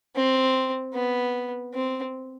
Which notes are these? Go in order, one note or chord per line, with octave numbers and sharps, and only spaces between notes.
C4
B3
C4